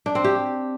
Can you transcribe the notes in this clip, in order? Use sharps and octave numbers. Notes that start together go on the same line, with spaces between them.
D4
C4
G4